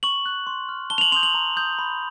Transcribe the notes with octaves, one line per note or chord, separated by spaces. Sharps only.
C#6 F#7
F#6
C6
F6
A5 G7
F7
F#7
C6 D#6 G6 F7
F#7
A#5
D#6 G6
B5